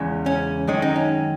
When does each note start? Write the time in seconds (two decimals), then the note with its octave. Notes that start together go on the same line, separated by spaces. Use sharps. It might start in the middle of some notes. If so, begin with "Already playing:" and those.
Already playing: E2 C#3 G#3
0.26 C#4
0.67 F#2 D#3 G#3 C#4
0.82 D#4
0.96 C#4